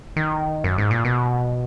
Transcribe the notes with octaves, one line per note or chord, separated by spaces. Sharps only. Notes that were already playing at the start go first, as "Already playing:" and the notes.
D#3
F#2
G#2
A#2
B2